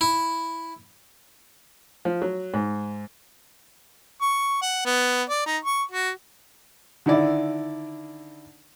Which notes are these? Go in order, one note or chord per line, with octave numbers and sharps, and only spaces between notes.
E4
F3
F#3
G#2
C#6
F#5
B3
D5
D#4
C#6
F#4
D3 D#3 E4 D5